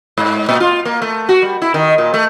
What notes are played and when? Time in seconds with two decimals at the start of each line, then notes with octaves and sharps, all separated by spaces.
0.18 G#2
0.49 A#2
0.60 F4
0.85 A#3
1.02 A3
1.29 F#4
1.42 G3
1.62 E4
1.74 D#3
1.98 A#2
2.14 A3